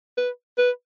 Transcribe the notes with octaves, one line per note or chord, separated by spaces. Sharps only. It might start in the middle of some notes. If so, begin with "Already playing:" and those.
B4
B4